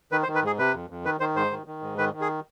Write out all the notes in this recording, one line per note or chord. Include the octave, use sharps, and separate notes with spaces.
D#3 B4
C5
D#3
B4
G#2 G#4
C3 B4
F2
F2
D#3 B4
D#3 C5
G#2 C5
D#3
D#3
G#2
D#3 B4
D#3
G#4